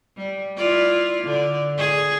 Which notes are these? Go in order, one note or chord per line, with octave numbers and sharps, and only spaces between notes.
G3
E4 F4 D5
D3 D5
G#4